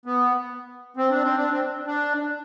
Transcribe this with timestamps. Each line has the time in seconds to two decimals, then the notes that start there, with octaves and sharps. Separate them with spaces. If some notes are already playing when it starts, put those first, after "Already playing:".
0.06 B3
0.97 C4
1.10 D4
1.23 C4
1.36 D4
1.50 C4
1.86 D4